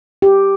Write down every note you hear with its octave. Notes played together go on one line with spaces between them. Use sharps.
G4